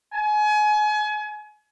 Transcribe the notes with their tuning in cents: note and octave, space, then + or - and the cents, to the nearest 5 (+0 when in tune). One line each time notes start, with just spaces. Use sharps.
G#5 +30